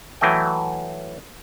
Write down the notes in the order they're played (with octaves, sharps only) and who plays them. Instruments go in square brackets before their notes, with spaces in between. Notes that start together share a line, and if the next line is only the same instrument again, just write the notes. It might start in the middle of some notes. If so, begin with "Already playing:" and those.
[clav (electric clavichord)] E3 F#3 A3 D#5 G5